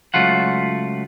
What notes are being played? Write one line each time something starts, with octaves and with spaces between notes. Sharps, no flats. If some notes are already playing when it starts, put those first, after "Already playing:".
C#2 F#3 A3 F4 F#5